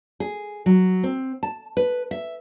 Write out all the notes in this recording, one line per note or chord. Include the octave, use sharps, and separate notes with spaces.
G#4
F#3
C4
A5
B4
E5